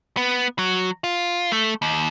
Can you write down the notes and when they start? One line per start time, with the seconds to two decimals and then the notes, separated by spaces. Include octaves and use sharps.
0.17 B3
0.59 F#3
1.04 F4
1.52 A3
1.82 D#2